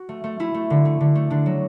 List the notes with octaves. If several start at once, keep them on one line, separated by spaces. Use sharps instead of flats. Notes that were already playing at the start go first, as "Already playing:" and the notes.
Already playing: F#4
A3
A3
A3 E4
A3
D3
A3
D3
A3
D3 D4
F#3